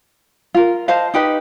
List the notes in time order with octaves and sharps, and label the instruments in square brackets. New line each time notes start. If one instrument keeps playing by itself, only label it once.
[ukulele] F4 A#4
C5 D#5 F5 A5
D#4 G4 B4 D#5